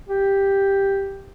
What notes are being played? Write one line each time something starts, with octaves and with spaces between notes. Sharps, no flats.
G4